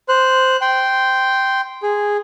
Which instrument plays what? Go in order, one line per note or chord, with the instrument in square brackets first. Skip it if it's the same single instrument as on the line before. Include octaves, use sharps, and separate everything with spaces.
[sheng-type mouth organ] C5 F#6
G5 C6
G#4